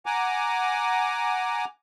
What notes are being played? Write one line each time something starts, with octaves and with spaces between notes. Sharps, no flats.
F#5 G#5 A#5 D6